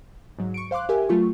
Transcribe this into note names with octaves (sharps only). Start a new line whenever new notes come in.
G#2 F#3
C#6 C#7 D7
C5 F5 C6 D6 F#6
G4 A#4 E5 G5 G#5
F#3 A3 F4 C#6